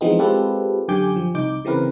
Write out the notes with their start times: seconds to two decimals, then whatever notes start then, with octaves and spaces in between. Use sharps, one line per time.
0.01 E3 F3 G#3 B3 C4 D#4
0.19 G#3 C4 F4 G4 A4 B4
0.88 F#2 D3 G4 G#5 D6 G6
1.16 F3
1.34 C2 D#4 D6 G6
1.65 C#3 E3 C4 A#4 B4